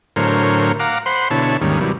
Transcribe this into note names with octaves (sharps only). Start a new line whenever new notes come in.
A2 D3 F#3 A#4 C5 C#5
F5 F#5 A#5 D6
C5 F#5 B5 C6
B2 D3 E4 C#5 A5
D#2 G#2 D#3 G3 C#4
C3 E3 F#3 G3